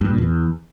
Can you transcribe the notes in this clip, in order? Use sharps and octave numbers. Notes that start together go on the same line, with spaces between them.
G2
A#2
E2